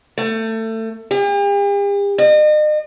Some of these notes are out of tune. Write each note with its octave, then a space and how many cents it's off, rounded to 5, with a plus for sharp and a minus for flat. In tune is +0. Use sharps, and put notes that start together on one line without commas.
A3 +25
G4 +45
D#5 -40